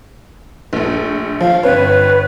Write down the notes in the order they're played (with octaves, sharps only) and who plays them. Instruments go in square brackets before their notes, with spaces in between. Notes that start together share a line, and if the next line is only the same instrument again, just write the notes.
[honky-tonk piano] A#1 A3
[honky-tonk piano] F3 [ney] F5
[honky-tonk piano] G1 C4 C#5 [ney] B4